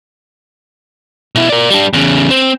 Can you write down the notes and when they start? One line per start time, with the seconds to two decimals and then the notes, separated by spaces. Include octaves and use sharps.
1.35 B2 E4
1.49 A#4 D5
1.70 G3 D4
1.93 E2 C#3
2.30 C4